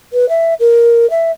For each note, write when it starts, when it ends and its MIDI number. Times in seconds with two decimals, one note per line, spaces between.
0.13 0.28 71
0.29 0.54 76
0.60 1.09 70
1.10 1.32 76